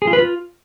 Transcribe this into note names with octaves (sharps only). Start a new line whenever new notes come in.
G#4
F4
B4
F4